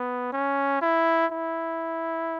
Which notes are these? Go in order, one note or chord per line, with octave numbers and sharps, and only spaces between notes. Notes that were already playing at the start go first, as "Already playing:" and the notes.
Already playing: B3
C#4
E4
E4